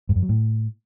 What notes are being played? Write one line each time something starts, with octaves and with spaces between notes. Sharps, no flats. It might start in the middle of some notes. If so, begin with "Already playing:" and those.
G2
F#2
F#3
A2